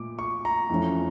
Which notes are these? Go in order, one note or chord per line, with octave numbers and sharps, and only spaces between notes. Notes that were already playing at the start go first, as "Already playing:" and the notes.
Already playing: A#2 A3 D6
C#6
A#5
F2 E3 A3 C#4